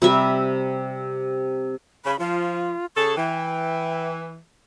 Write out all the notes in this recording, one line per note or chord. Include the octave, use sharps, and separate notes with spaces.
C3 G3 E5
C#3 B5
F3 F4
C#3 G#4 A4 C#6
E3 G5